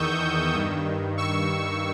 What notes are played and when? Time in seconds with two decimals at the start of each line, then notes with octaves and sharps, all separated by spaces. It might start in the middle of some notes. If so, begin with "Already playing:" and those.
Already playing: E2 D#3 C#6 D#6 E6 G6
0.54 G2 D#3
1.18 C#6 E6